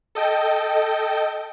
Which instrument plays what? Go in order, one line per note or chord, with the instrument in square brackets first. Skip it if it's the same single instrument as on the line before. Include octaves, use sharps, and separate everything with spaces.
[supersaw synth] A4 D#5 G5